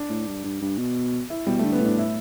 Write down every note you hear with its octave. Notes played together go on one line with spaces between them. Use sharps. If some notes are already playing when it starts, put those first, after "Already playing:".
Already playing: D4
A2
G2
G2
G2
B2
E4
B2 G3
A3
D3
B3
A2 D4
E4